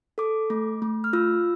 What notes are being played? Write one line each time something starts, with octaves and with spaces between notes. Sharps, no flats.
A4 D6
A3
A3
F6
F4 E6